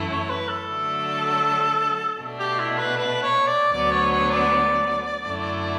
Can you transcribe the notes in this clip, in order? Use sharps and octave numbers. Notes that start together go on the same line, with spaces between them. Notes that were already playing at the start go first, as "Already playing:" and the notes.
Already playing: F#2 E3 A3 E4
C#5
B4
A4
D3 F#3 A3 D4
B2 A3 D4
G4
E4
B4
B4
C#5
D5
D2 D3 F#3 B3 D5
C#5
C#5
D5
F#2 D3 A3 E4